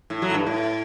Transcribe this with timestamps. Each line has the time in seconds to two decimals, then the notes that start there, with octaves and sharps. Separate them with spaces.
0.10 A2
0.22 F#3
0.30 A2
0.34 G2
0.47 A2